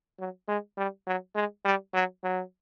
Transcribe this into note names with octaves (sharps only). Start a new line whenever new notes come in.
F#3
G#3
G3
F#3
G#3
G3
F#3
F#3